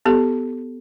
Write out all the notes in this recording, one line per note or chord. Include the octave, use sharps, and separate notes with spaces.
B3 G4 A4